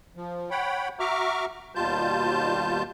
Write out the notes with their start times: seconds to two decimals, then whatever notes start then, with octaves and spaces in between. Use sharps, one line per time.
0.16 F3
0.51 C#5 F#5 G5 B5
1.00 F#4 E5 A#5 C#6 D6 F6
1.75 D#2 B2 G3 F4 A5 G6